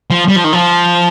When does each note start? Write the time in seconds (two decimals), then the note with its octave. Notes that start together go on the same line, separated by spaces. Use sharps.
0.10 F3
0.28 G3
0.36 F3
0.44 D#3
0.53 F3